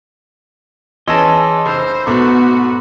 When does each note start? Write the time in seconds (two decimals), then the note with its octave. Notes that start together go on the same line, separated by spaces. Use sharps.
1.08 E3 C#4 G#4 D#5 A5 C6 E6 A#6
1.66 F1 C5 B5 E6
2.07 G#2 B2 A3 B3 F#4 D6